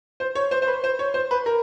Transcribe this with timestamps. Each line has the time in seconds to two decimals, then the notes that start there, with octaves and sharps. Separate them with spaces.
0.20 C5
0.35 C#5
0.51 C5
0.62 C5
0.68 B4
0.84 C5
0.99 C#5
1.14 C5
1.31 B4
1.46 A#4